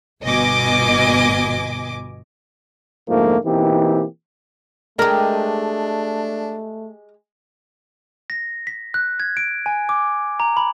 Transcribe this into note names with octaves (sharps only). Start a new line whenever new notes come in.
G1 B2 D#5 G#5 D6
F2 G#2 D3 F3 A3 A#3
B2 E3 A#3 C4 D#4 G4
G#3 A3 D4 G4 A#4
A#6
B6
F#6
G#6
D7
G#5
D6
A#5
B5